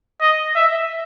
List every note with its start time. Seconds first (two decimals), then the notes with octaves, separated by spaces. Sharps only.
0.20 D#5
0.55 E5